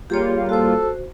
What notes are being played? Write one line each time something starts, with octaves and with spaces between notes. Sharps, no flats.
G3 A#3 F4 G4 G#4 C#5
F#4 A4 C5